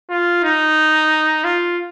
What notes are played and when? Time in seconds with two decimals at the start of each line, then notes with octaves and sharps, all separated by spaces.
0.10 F4
0.44 D#4
1.44 F4